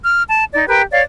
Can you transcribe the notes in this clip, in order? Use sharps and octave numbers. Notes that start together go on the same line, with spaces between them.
F6
A5
D#4 D5
G4 A#4 B4 G5
C#5 D5 F5